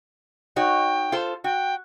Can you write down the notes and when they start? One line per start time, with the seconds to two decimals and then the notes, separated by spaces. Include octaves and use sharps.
0.56 D#4 F#4 C#5 G5
1.12 F4 A4 C5
1.44 F#4 G5